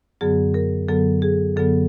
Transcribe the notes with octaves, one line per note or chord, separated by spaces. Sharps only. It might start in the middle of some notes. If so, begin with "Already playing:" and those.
F#2 D3 F#3 B3 G#4
A#4
F#2 D3 F#3 B3 A4
G#4
F#2 D3 F#3 B3 A4